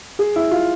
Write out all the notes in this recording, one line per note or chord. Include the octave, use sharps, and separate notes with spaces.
G#4
E4
F4